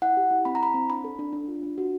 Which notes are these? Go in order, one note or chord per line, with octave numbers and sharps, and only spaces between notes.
E4 F#5
G4
E4
C4 B5
A#5
E4 B5
C4
D4 B5
A4
D4
D4
F4
D4
F#4